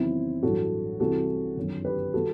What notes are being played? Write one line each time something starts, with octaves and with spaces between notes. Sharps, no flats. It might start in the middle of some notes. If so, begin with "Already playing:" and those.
Already playing: E2 C3 D#3 F#3 C4 E4
A1 G2 F#3 F#4 A4
C2 C3 E3 G3 F#4 A4
G1 F#2 D#3 F#3
G4 B4
D#3 G3 F#4 A4